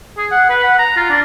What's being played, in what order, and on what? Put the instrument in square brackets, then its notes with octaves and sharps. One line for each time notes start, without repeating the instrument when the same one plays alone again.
[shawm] G#4
F#5
B4
F#5
A#5
F4
D4